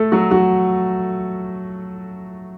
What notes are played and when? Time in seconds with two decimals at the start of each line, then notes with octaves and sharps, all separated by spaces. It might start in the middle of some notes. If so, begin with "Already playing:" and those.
Already playing: A3 A4
0.12 F#3 F#4
0.31 F#3 F#4